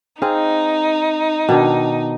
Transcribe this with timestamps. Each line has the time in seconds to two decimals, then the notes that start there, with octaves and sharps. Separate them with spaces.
0.22 C4 D#4 G#4 F5
1.49 B2 D#3 D4